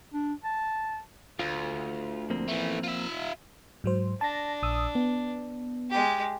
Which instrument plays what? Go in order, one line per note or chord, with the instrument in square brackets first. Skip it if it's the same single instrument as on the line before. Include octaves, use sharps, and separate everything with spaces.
[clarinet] D4
A5
[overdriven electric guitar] D2 [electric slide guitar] F4
[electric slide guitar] F3 A#3 C4
[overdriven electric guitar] E3 A3
F4 E5
[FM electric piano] G#2 F#3 C5
[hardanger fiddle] D4 [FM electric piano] A5 A#6
[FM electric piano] A#1 D#6 E6
B3
[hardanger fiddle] G#3 G4